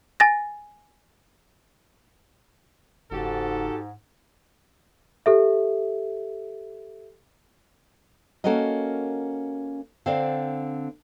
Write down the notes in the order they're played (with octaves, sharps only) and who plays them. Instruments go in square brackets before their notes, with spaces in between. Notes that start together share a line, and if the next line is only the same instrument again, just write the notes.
[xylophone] G#5 A6 A#6
[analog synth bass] F#1 [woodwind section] G#2 [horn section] F#4 G4 A4
[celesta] G4 A4 E5
[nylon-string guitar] A#3 C#4 F#4 A4 A#4 D#5
D3 C4 C5 D5 F5